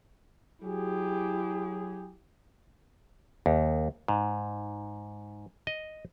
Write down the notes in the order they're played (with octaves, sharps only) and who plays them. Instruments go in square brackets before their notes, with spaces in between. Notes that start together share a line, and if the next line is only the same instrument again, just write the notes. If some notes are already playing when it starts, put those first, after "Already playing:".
[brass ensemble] F#3 G#4 [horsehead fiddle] E4 G4
[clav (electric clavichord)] D#2
G#2
D#5